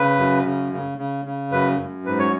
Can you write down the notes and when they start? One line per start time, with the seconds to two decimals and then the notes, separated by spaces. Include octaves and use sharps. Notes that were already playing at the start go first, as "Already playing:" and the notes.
Already playing: C#3 B4
0.19 F#2
0.45 C#3
0.72 C#3
0.98 C#3
1.25 C#3
1.52 F#2 B4
1.79 F#2
2.06 G#2 B4
2.19 C#5